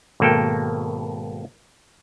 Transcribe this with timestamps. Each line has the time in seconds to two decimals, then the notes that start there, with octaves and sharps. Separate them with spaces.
0.20 G#1 B2 A#3 A4 G5